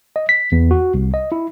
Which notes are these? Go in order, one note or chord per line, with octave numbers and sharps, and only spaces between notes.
D#5
B6
E2
F#4
C2
D#5
E4